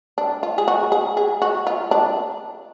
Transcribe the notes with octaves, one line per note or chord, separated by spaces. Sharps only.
D4
F4
G#4
F#4
G#4
G#4
F#4
F4
D4